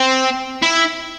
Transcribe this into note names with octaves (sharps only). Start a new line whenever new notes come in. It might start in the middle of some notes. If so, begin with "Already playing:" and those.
Already playing: C4
E4